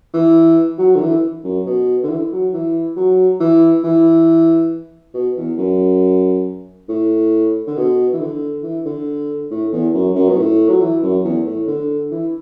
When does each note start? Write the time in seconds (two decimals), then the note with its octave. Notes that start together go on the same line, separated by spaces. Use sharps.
0.13 E3
0.78 F#3
0.95 D3
1.00 E3
1.44 F#2
1.66 B2
2.03 D3
2.09 E3
2.32 F#3
2.53 E3
2.96 F#3
3.40 E3
3.83 E3
5.14 B2
5.37 E2
5.58 F#2
6.89 A2
7.67 D3
7.76 B2
8.13 E3
8.20 D3
8.63 E3
8.85 D3
9.50 A2
9.72 E2
9.94 F#2
10.15 F#2
10.29 B2
10.38 A2
10.68 F#3
10.80 E3
11.02 F#2
11.24 E2
11.46 A2
11.68 D3
12.11 E3